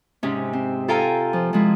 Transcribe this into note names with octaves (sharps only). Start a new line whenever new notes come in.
G#2 C3 C#4
C4
F4 A4 F5 G5 G#5 A#5
F3
F3 G#3 E4